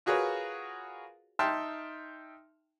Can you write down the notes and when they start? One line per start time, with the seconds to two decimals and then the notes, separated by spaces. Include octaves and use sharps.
0.06 F4 F#4 G#4 A#4 B4 C#5
1.39 D#4 E5 G5 A5 C6 F6